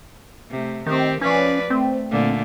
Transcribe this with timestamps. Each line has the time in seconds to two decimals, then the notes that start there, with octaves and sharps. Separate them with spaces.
0.51 C3 A3
0.86 D#3 C4 G4
1.21 F3 C#4 B4 D5
1.70 A3 C4
2.10 A#2 D3 A3